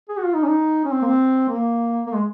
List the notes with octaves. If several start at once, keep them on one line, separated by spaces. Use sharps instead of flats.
G#4
F#4
F4
D#4
C#4
D#4
C#4
C4
A#3
C4
A#3
A#3
G#3